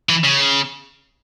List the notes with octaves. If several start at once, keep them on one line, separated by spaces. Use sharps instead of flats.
E3
C#3